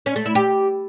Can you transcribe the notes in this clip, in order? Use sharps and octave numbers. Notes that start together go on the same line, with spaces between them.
C#4
A3
E4
G4